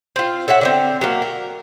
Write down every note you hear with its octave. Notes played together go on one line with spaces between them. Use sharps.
C4 F4
A4 C#5 E5 F#5
D3 B3 C4
F#3 A3 A#3
A#4